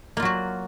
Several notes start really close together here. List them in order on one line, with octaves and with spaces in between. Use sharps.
A#3 F4 F#3 F#4